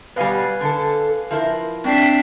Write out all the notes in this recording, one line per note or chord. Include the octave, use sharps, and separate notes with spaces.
B2 G3 B4 F5 G#5
D3 A4
F3 E4 A#4
C4 D4 E5 G5 C7